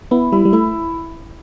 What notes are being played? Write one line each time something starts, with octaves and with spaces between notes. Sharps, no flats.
B3 E4
G3 E4
G3
A3 E4